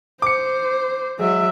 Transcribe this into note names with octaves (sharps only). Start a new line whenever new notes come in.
C5 D6 C#7
F#3 G#3 E5